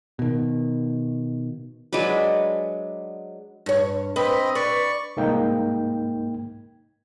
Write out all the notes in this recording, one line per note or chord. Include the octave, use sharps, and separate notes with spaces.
B2 D#3
F#3 G#3 D4 B4
G2 C#5
C4 B4 D#5
B4 D5 C#6
C2 G#2 A#3 D#4 G5